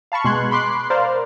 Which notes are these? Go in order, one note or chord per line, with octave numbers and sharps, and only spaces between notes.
F5 A5 B5 C#6
B2 G#3 C6 C#6 F#6 G#6
B5 C6 D6 F#6 C7
A#4 C5 D5 F5